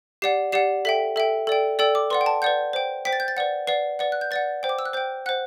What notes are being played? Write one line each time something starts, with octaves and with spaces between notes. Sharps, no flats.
G4 D5 F#5 C7
G4 D5 F#5 C7
A4 E5 G5 B6
A4 E5 G5
A4 D5 G5
A4 D5 G5 E6
D6
B4 D5 F#5 C6
G5
A5
B4 D5 F#5 G6
C5 G5
C5 G5 B6
A6
G6
A6
B4 D5 F#5
B4 D5 F#5 C7
B4 D5 F#5
F#6
G6
B4 D5 F#5 A6
C5 G5
D6
E6
F#6
C5 G5 G6
C5 F#5 F#6